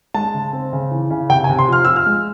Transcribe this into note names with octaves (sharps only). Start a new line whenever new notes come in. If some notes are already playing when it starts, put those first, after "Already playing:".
G#3 A5
C#3
C4
C#3
E3
C#3
C3 G5
G#5
C3
C6
F3 F6
F3 E6
F6
G#3